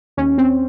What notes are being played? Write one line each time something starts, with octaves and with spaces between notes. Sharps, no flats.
D#2 C#4
C4